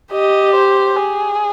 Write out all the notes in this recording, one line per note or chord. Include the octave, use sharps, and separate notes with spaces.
G4 D#5
C5
G#4